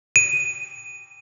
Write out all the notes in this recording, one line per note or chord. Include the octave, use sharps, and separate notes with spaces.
D#7